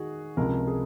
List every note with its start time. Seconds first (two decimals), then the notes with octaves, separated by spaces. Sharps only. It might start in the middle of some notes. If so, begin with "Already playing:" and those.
Already playing: D#3 F#4 G#4
0.37 C#2 C3 F3 A#4
0.68 G#4